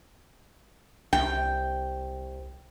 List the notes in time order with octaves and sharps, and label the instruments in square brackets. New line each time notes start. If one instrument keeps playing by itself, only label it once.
[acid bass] C2 [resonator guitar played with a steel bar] G5